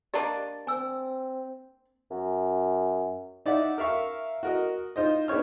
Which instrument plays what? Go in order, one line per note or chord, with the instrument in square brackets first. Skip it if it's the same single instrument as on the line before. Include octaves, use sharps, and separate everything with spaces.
[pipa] A#3 D4 D5 [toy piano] G4 D#5 A5
[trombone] C4 [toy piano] G#5 E6
[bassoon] F#2
[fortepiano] D#4 D5 E5 F#5
A#4 E5 F5 C#6
F#4 A#4 D#5
D#4 F4 C5 D#5
B3 D4 D#4 C#5 F6